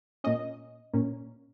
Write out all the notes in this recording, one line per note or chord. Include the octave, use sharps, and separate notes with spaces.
A#2 A#3 C#4 D#5
A#2 A#3 C#4